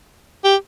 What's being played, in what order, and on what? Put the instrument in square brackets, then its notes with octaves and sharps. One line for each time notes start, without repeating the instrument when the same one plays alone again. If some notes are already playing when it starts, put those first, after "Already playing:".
[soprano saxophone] G4